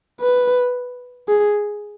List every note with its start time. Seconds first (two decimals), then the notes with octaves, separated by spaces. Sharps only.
0.21 B4
1.29 G#4